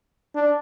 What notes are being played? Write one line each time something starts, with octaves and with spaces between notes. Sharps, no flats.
D4